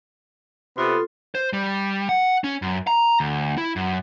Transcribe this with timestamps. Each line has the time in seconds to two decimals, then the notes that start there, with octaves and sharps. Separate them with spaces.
0.78 C3 B3 F4 A4 C6
1.35 C5
1.53 G3
2.09 F#5
2.44 C#4
2.62 F#2
2.87 A#5
3.20 D2
3.58 E4
3.76 F#2